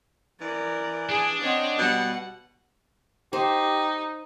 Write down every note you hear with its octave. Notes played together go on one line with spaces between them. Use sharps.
E3 A#4 D5
D4 G#4 G#5
C4 C#5 D#5 F#5
B2 G3 F#5
D#4 G4 C5